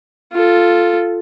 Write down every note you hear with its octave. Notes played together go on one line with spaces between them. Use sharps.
F4 A4